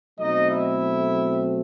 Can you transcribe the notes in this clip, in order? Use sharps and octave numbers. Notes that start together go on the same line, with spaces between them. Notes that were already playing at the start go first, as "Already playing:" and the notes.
B2 F#3 A3 C4 D#4 D#5
E4 E5